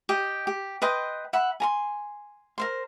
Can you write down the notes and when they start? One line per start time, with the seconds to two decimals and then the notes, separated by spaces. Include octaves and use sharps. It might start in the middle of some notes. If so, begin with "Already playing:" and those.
0.09 G4 D#5 G5
0.47 G4
0.82 B4 D#5 G5 C6
1.33 E5 F#5 B5
1.60 G#5 A#5 C6
2.58 A#4 C5 C6